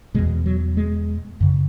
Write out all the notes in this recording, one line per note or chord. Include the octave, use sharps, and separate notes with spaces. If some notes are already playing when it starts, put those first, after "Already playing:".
E2 B2 G#3
F#3
G#3
F#2 C#3